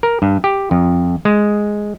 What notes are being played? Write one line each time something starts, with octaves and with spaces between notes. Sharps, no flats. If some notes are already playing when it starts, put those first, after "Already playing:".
A#4
G2
G4
F2
G#3